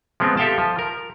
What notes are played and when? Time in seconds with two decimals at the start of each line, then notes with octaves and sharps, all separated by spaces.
0.20 F3 G#3 B3 C4
0.37 G4 A4 E5 F5 G5 A5
0.58 F3
0.79 A#4